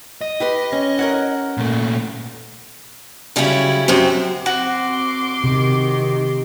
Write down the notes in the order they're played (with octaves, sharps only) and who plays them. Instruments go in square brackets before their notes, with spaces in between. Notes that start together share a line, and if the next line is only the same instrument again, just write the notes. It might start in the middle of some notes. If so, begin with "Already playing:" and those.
[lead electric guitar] D#5
[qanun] G4 B4 C6
C#4
A#4 C#5 F#5
[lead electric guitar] A#2 A3
[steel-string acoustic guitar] F#2 C#3 G3 C#4 E4
F#2 C3 C4
[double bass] C4 [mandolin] F#4 [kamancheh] C6 D6
[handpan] C3 [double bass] D#3